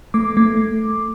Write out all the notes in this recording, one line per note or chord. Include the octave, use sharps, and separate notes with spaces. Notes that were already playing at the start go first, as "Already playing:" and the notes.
A3 D6
A3